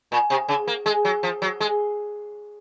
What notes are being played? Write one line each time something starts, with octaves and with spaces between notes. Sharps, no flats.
A#2
C3
C#3
A#3
G#3
F#3
F3
F#3
G#3